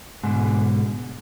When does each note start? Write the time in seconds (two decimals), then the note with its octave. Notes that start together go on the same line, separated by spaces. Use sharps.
0.24 G#2 B2 D3